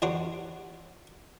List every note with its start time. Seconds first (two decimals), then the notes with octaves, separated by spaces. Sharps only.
0.02 E2 C4 D4 G4 C#5 F#5